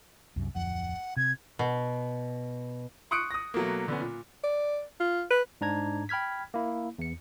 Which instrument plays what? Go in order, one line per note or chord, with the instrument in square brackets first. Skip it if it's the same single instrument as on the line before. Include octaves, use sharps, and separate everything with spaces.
[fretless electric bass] C2 F#2
[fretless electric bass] D1 F2 [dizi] F#5
[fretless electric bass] C3 [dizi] G#6
[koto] B2
[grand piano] C6 C#6 D#6 F#6 C#7 D7
D#6 A#6
B2 F#3 A3 A#3
D3 B3 C#4
A#2
[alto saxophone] D5
F4
B4
[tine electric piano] G#2 D4 A#5 G#6
G5 B5 F6 G#6 B6
A#3 E4
E2 C#7